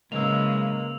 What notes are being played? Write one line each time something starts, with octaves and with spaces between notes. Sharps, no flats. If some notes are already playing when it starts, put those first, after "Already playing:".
C#3 E3 F#3 G#3 A#3 E6 F7